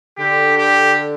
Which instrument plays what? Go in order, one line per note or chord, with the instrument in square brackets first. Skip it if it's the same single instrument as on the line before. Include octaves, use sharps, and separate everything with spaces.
[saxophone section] D3 [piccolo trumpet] G4
[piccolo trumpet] G4